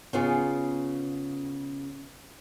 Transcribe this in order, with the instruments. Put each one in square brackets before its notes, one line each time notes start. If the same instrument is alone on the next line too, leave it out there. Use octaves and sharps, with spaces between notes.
[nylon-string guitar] C#3 B3 F4 G#4